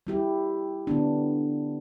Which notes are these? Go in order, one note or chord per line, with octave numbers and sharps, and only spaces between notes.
G3 E4 G4
D3 B3 D4